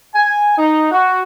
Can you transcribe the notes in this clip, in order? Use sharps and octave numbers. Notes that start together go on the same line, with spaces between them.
G#5
D#4
F#4